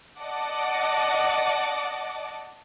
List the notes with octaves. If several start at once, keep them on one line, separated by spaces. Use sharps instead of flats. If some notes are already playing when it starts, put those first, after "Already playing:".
D5 D#5 F#5 A5 D6